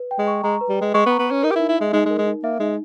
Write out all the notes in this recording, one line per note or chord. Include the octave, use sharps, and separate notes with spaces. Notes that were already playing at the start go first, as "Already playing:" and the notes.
Already playing: B4
G5
G#3
C#6
G#3 A#5
B4
G3
G#3 G5
G#3 C#6
B3
A#5
B3
C#4 B4
D#4 A#4
G4
E4
D#4
E4
G#3 E5
G#3 D#4
G#3
A#4
G#3
D#4
A#3 E5
G#3 D#4